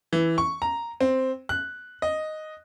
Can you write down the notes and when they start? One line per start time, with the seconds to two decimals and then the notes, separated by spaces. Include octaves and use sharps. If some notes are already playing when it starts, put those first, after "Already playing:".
0.13 E3
0.38 C#6
0.62 A#5
1.01 C4
1.49 F#6
2.02 D#5